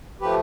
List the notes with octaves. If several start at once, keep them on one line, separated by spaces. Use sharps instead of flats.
F3 A3 G4 B4